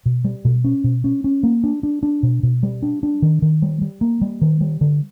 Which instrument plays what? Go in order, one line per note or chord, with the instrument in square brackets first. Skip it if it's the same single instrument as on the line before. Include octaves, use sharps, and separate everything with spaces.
[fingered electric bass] B2
G3
B2
C#4
B2
C#4
C#4
A#3
D4
D4
D4
B2
B2
G3
D4
D4
D#3
D#3
G3
G3
A#3
G3
D#3
G3
D3